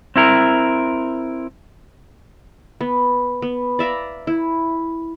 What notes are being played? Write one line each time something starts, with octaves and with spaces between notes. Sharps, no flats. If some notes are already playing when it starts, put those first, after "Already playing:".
C4 E4 A#4
B3
B3
D5 E5 F5 A#5
E4